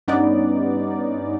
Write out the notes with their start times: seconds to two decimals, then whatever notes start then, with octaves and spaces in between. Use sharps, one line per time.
0.08 G2 B3 C#4 D#4 D5